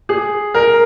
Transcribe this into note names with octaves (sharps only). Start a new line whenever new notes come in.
G#4
A#4